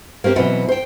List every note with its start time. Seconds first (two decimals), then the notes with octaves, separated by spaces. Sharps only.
0.24 A#3 C4 G4 C5
0.36 B2 E3 F#3 C4 C#4 F#4
0.68 C5 G5